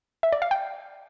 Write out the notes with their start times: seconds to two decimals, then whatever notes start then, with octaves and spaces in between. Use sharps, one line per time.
0.23 E5
0.32 D5
0.42 F5
0.51 G5